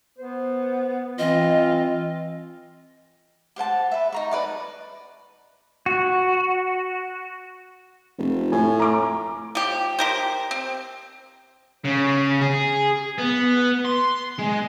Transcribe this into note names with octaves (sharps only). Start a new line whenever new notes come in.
B3 C5
E3 C4 F4 D#5
G4 C5 F#5 A5
B4 E5
D#4 A#5 C#6
B4 D5 A5
F#4
F1
A2 G#5
A#5 D6
F3 G4
G4 A#4 C5
C4
C#3
G#4
B3
C6
G#3